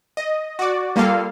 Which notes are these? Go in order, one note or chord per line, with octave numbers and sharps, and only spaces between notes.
D#5
F#4 D5
G3 A#3 F4 A4 F5